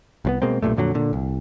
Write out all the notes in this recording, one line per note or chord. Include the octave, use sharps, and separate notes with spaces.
C2 F3 B3
B2 G#3 A#3 C4
B1 G2 A#2 A3
F2 A#2 D3 F#3
A#2 D3
C2